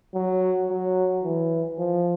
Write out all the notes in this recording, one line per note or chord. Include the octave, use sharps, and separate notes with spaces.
F#3
F#3
E3
F3